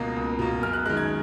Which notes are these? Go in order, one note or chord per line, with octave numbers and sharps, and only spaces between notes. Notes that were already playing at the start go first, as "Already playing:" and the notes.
Already playing: C#2 B2 A#3
C#2
B2 A#3
F#2 F6
F#6
D#3 G#3 F#6
G#6